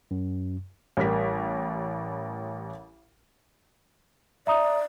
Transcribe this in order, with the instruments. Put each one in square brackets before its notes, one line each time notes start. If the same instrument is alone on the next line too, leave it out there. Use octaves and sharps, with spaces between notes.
[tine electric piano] F#2
[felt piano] A1 G3 A#4 B6
[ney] D5 [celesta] E5 A#5 D#6